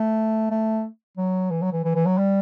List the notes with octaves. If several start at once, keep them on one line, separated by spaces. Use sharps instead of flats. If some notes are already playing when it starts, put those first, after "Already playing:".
Already playing: A3
A3
F#3
E3
F#3
E3
E3
E3
F#3
G3